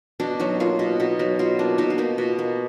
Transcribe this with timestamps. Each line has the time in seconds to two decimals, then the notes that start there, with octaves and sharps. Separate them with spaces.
0.20 B2 D4
0.39 F#3 D#4
0.60 A#3 F4
0.79 B2
1.00 B2 D#4
1.19 F#3 D#4
1.39 B2 F4
1.59 A#3 D4
1.78 B2 D#4
1.90 F4
1.98 A#3 D#4
2.18 B2
2.39 A#3